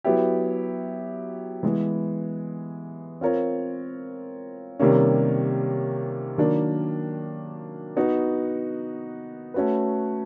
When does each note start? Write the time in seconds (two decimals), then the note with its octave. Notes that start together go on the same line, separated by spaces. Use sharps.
0.04 F#3 B3 E4 G4
1.63 E3 G#3 B3
3.21 C4 F4 A#4 C#5
4.79 C3 D#3 G3 A#3 C#4
6.38 D#3 F#3 A#3 D4
7.96 B3 D#4 F#4
9.54 A3 C#4 F#4 B4